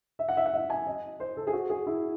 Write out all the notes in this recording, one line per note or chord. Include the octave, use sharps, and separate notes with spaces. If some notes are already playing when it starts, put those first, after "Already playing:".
E5
F#5
E5
F#5
E5
G#5
D#5
C5
A4
G#4
F#4
G#4
E4